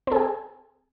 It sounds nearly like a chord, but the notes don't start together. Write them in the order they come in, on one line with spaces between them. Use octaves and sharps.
C4 A4 G#4